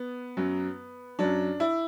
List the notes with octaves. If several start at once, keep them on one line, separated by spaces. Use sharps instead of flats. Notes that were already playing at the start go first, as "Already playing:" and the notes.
Already playing: B3
F#2 F#3
F#2 F#3 D4
E4